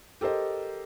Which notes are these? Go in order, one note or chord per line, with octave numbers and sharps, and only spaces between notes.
G4 A4 A#4 C5 D#5